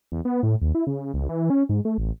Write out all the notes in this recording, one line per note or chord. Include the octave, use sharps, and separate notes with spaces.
E2
B3
A2
D#2
E4
C#3
C#2
E3
C#4
G#2
A3
A1